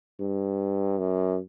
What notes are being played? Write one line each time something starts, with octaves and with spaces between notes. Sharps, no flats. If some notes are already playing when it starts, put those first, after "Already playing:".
G2
F#2